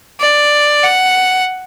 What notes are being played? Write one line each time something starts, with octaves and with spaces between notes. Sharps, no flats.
D5
F#5